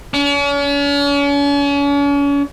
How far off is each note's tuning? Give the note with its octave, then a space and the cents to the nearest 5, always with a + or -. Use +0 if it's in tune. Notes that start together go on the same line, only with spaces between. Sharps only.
C#4 +40